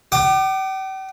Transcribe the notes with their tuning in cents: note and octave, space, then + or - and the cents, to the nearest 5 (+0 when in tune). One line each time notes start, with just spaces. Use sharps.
G5 -45 D6 +30